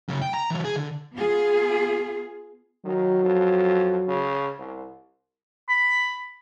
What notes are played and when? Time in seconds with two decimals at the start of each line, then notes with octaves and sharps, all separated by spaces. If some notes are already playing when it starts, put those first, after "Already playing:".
0.08 F#2 C#3
0.22 G5
0.34 A#5
0.50 E3 F#3
0.65 G#4
0.76 D3
1.13 B3 F4 G#4
2.85 D#3 F#3
3.24 F2
4.08 C#3
4.58 C2
5.69 B5